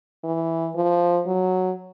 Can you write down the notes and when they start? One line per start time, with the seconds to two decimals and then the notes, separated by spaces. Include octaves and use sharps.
0.24 E3
0.76 F3
1.27 F#3